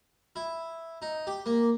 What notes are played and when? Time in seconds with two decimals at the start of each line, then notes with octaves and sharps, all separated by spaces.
0.36 E4
1.02 D#4
1.27 G4
1.46 A#3